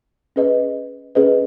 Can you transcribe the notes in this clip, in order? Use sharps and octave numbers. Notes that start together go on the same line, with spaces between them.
C#4 G#4 B4 D#5
C#4 G#4 B4 D#5